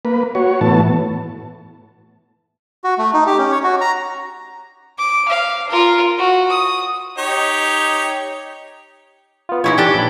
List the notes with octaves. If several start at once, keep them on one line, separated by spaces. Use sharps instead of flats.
A#3 B4
F#4 C#5
A2 E3 B3 A5
F#4
A3
D#4
G4
C#4
C#5
F#4
A#5
D6
F5
F4 A#4
F#4
D#6
D#4 G4 C#5
B3 F4
E3 D#4 E4 C#5
D4 G4 A4 C#5
A#1 B5